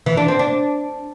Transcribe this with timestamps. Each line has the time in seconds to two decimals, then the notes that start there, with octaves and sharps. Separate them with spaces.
0.06 E3
0.17 D4
0.28 C4
0.39 D4